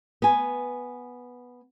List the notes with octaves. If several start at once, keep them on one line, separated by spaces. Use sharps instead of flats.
B3 G#5